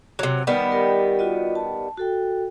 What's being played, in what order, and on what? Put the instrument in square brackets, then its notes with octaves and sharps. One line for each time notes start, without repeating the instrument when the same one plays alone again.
[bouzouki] C3 F#3
D#3 G3 B3
[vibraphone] G4 A#4 G5
F4 F#4 D#5
A5
F#4 A4 G5